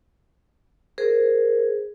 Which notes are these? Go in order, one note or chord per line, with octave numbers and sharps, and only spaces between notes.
G#4 A#4 C5